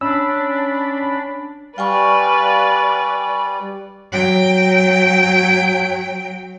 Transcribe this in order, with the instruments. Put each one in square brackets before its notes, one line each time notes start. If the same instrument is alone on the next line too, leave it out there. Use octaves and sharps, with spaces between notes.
[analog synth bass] C#4 [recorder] D4 [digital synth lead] B5 [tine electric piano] E6
[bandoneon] G3 [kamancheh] B4 D5 [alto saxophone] F5 [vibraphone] G5 G#5 C#6
[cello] F#3 G5